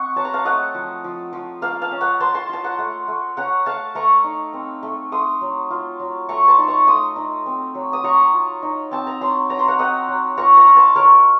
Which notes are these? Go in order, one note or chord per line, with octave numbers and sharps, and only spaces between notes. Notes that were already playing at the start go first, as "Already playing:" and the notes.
Already playing: C4 D#5 F#5 C#6
F#3 A5
A#5
F5 A5
A3 D#5 F#5
F3
F3
F3
A#3 F5 A5
F5 A5
C#4
F#5 A#5
A#3 A5 C6
A5 C6
F4 A5
F#5 A#5
A3
A3
C#4 F#5 A#5
A3 F5 A5
A3 A#5 C#6
D#4
C4
A3
A3 C6 D#6
F#3
F4
F#3
A3 A#5 C#6
A5 C6
D#4
A#5 C#6
A3 C6 D#6
D#4
C4
F#3
D#6
F#3 A#5 C#6
F4
D#4
C4 A5
A#5
F#3 A5 C6
F#3 A#5
C6
F#5 A#5
C4 D#5 F#5
F#3
F4 A#5 C#6
A#5 C#6
F4
A5 C6
F#3 A#4 C#5